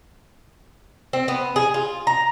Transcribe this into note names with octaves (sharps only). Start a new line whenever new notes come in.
C4
B3
G#4
F4
A#5